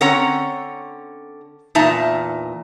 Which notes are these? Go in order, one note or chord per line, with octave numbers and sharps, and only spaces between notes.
D3 C4 C#4 C#5 F#5 A#5
E2 A#2 D#4 E5 A5 A#5